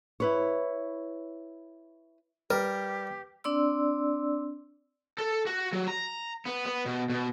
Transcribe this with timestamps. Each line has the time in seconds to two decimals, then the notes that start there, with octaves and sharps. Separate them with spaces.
0.20 E4 B4 C#5
2.50 G3 G4 A#4 B4
3.44 C4 D4 D5 C6 E6
5.18 A4
5.47 F#4
5.73 F#3
5.88 A#5
6.46 B3
6.66 B3
6.86 B2
7.10 B2